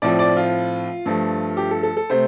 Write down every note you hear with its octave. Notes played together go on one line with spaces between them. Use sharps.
A2 F3 C4 D5
D5
F4
G2 F3 A3
G4
A4
A4
A4
C3 A3 C4 C5